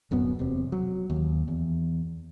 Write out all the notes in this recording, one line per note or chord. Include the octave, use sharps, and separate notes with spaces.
D1 F#2 B2 B3
E1 C3
F#3
D#2
E2